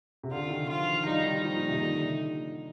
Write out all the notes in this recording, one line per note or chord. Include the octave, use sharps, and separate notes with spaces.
C3
D3 F4
D#3
F3 F4
G3 D#4
D#3
F3
A#2
C3
D3